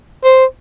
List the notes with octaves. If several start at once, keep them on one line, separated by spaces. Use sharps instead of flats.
C5